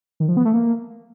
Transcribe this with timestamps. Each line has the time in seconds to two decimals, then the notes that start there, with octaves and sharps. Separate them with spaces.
0.20 D#3
0.28 F3
0.37 B3
0.45 A3
0.54 A#3